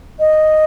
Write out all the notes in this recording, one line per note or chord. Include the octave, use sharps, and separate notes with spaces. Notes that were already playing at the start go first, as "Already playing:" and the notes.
D#5